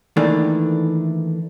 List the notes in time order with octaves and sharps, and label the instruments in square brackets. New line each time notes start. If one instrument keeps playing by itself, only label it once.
[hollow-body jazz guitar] D#3 E3 A3 A#3 D4